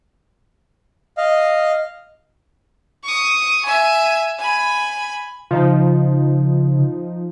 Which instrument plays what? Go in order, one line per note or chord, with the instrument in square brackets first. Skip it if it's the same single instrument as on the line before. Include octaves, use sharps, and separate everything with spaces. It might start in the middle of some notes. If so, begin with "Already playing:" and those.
[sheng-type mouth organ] D#5 F5
[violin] C#6 D#6
E5 G#5
G#5 B5
[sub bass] C#3 [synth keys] F3 D#4